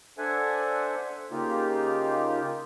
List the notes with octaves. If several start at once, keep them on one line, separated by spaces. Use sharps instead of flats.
D4 A4 C5 E5 F#5 G#5
C#3 A#3 D#4 F4 G4